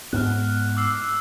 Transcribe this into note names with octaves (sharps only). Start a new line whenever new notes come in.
G#2 B3 F6 F#6
D6 E6 C7